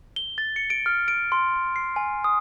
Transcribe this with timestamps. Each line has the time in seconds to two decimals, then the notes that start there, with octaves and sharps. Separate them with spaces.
0.16 G7
0.38 A6
0.56 C#7
0.70 D7
0.86 F6
1.08 D7
1.32 C6
1.76 C7
1.96 G#5
2.24 D#6